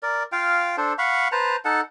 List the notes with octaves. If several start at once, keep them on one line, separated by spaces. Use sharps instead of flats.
A#4 D5
F4 F5 G5
D4 A4 C5
F5 F#5 B5 C#6
B4 C5 A5 A#5
D#4 A4 F#5 A5